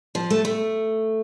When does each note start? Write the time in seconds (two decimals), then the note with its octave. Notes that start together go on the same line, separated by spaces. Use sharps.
0.15 F3
0.30 A3
0.45 A3